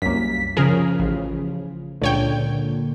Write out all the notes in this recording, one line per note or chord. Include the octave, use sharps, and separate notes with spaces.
C2 F#2 A#3 B6
C#3 F3 G#4 A#4
A1
C#2 A#2 D3 C#5 G5